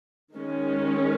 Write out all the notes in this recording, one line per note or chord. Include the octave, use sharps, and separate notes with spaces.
D#3 G#3 C#4